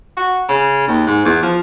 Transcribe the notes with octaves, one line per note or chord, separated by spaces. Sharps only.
F#4
C#3
D#2
G#2
E2
F3